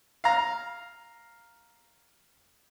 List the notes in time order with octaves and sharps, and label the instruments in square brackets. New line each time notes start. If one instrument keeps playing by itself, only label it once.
[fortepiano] F5 A#5